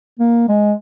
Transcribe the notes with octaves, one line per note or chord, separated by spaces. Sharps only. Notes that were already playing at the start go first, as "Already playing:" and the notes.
A#3
G#3